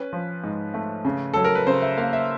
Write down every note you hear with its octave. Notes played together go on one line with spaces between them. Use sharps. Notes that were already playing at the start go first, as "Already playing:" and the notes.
Already playing: C#4 B4
F3
G#2
A3
C#3
F#3 A4
A#4
B4
C#3 C5
E5
A#3 F5
E5